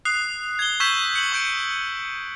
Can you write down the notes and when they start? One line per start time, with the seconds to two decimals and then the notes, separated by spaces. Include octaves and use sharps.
0.05 D#6 F#6 C7
0.59 G#6 G7
0.80 C#6 E6 G6 G#6 B6 E7
1.16 C#7 F#7
1.32 C#6 G6 D7